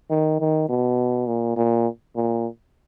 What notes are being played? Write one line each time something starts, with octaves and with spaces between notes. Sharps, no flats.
D#3
D#3
B2
A#2
A#2
A#2